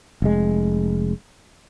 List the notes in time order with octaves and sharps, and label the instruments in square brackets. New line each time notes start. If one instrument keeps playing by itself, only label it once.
[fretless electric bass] F1 G#3